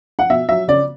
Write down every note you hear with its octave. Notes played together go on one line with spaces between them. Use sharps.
F#5
B2 E5
F#3 E5
C#3 D5